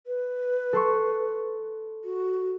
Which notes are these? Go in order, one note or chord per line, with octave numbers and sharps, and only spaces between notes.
B4
A4 C6 C#6
F#4